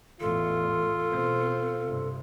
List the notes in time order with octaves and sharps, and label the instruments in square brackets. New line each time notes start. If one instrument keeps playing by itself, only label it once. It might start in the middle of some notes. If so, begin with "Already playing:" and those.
[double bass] A1 E2 [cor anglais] F4 [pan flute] A4
[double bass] B2 C4
G2 C3